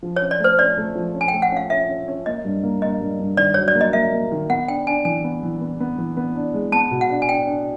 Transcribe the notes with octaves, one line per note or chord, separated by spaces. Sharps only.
F3
C#5
C#4
D5
A3 C5
C#4 D5
A3
F3
C#4
G#5
A3 G5
F#5
C#4 F5
C#4 E5
C#4
C#4
A#3 D#5
G2
A#3
A#3 D#5
G2
G2
D#3 D5
F#3 C#5
D5
A#3
D#5
A#3 E5
A#3
D#3
B3 F#5
D4 G5
D4 G#5
E3 G#5
B3
E3
B3
B3
E3
B3
D4
G#3
B3 A5
B2
F#5
D4
G#5
D4 G5
D4